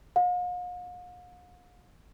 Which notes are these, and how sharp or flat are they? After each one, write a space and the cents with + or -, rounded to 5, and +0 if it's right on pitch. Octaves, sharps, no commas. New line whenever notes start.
F5 +45